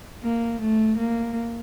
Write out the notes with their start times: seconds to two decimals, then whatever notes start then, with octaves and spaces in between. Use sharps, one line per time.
0.23 A#3
0.61 A3
0.97 A#3